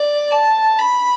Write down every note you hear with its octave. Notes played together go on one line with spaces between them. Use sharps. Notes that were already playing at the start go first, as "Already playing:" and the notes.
Already playing: D5
A5
B5